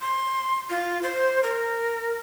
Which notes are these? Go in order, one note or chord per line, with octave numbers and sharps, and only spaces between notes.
C6
F4
C5
A#4